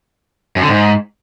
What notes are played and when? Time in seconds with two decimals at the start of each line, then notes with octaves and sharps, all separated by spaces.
0.56 F#2
0.62 D3
0.69 G#2